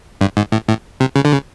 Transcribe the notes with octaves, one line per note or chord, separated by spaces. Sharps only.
G2
G#2
A2
A2
C3
C#3
D3
C#3